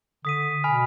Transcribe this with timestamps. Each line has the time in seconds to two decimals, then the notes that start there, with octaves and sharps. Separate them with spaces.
0.25 D3 D#6 B6 D#7
0.64 B2 G#5 B5 F6